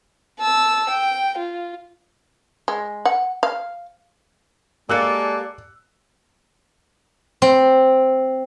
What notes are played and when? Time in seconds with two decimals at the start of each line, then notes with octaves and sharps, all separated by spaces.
0.39 A5 E6
0.90 G5
1.38 F4
2.68 G#3
3.05 F#5
3.43 F5
4.89 G#3 A#3 G4 A4 D5 E6 F#6 C#7
7.42 C4